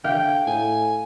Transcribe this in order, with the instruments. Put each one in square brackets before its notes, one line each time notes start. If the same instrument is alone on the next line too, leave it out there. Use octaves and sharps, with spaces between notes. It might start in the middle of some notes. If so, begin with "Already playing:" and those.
[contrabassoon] D3 [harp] F5 [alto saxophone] G5
[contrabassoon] A2 [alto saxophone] G#5